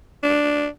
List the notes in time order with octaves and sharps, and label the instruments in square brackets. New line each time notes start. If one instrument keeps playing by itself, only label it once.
[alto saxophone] D4